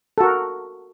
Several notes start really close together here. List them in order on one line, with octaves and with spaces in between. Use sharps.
A4 F#4 A#4